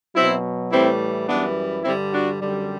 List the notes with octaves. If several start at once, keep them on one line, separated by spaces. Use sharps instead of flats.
B2 F#3 C4 E4
A2 E3 G3 C4 E4
F#2 E3 G3 B3 D4
G2 D3 G3 C4 E4
D4 F#4
F#2 D3 G3